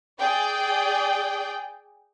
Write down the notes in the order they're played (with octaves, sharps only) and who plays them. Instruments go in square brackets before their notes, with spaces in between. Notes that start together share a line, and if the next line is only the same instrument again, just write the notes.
[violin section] G#4 D5 G5